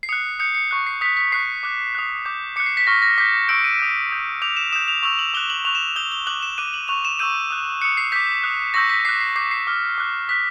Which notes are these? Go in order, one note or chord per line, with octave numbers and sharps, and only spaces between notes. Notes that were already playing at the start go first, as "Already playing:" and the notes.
C7
D#6 F#6 C#7
D#6 G6 C#7
C#7
C#6 F#6
C7
D#6 F#6 B6
B6
C#6 F#6 C7
D6 F#6
D#6 F#6
D6 G6
D6 F#6 C#7
C7
B6
C#6 F6 A#6
A#6
D6 G6 B6
C#6 E6 G6 D7
D#7
D#6 G6
D#6 G6
D6 G6 F7
E7
D#6 G6 E7
F7
C#6 E6 G6 F7
F#7
D6 F#6 G7
F#7
C#6 F#6 F7
E7
D#6 G6 G7
G7
D6 F#6 F#7
E7
D6 F#6 D#7
F#7
C#6 F#6 F7
E7
C#6 E6 G6 D#7
D#6 F#6
D#6 F#6 C#7
C7
D6 G6 B6
D#6 F#6
C#6 E6 G6 A#6
B6
D6 F#6 C7
C7
D6 G6 C7
C7
D6 F6
D6 F#6
D#6 F#6 B6